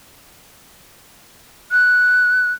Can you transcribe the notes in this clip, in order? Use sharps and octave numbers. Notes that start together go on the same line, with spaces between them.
F#6